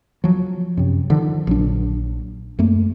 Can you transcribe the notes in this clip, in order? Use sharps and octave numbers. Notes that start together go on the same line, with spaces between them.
F3 F#3
F#2 C3
D3 D#3 F3
A#1 F#3 D4
F#2 A3 A#3